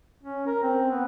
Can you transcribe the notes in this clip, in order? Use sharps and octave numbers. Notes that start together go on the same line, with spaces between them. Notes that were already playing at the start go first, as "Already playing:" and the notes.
C#4
A#4
C4
B3